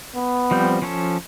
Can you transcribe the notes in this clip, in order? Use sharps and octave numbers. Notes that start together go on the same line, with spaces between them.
B3
F3 G3 C4
F3 C#4 A4